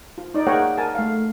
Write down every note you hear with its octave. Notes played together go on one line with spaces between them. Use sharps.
F4
D#4 D5
A#3 G#4 A#4 C#5 F#5 G5
A#4 G#5 A5
A3 F5